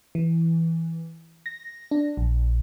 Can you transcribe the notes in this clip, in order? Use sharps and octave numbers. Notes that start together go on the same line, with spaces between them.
E3
A#6
D4
A#1